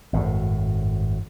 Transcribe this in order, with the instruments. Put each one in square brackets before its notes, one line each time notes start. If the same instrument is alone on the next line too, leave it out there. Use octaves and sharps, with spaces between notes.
[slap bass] G#1 F#2 A2